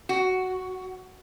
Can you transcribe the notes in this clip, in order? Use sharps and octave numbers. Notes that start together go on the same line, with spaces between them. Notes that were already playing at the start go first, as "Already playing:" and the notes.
F#4